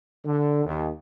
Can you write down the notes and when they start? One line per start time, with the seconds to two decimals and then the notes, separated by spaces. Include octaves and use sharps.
0.25 D3
0.65 D#2